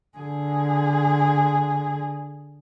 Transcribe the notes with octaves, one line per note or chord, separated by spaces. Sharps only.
D3 G#4